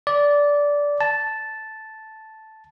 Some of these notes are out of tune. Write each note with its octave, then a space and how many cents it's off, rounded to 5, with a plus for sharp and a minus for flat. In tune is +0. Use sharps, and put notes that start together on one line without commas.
D5 -15
A5 -5